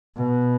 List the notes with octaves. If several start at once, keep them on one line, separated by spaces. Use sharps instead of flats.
B2